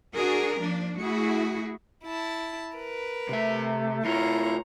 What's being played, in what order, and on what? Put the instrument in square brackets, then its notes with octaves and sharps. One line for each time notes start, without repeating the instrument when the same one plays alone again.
[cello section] D4 F#4 G#4 A#4
F3 A#3 D4
A3 E4 F#4 G#4
[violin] E4 A5
A#4 B4
[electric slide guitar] C3 E5 [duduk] A3
[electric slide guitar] A3 F4 [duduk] E4 [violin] C#5 A#5